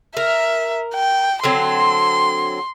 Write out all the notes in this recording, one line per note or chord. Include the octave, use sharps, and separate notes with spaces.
A#4 E5
G5
D3 F#3 C4 C6